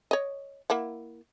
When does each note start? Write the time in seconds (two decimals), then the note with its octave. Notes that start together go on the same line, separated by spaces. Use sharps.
0.11 C#5 D#5
0.70 A#3 E4 F#5